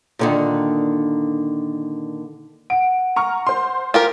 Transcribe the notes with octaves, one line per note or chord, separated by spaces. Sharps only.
A#2 D3 D#3
F#5 D7
A#5 C#6 F6
C5 C6
F4 G4 A#4